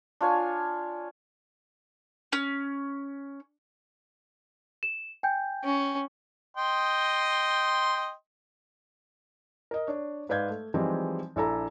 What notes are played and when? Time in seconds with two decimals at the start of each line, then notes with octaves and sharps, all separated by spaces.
0.21 D4 F4 C#5 G#5
2.33 C#4
4.83 E7
5.23 G5 G#5 G6
5.64 C#4
6.56 D#5 G5 C6
9.71 A#4 D#5
9.87 D4 C#5
10.29 G#2 B4 D5 F5 G6 G#6
10.49 A3
10.74 E3 F3 G3 G#3 C4 D#4
11.36 A#1 D4 E4 A4 D5 A#5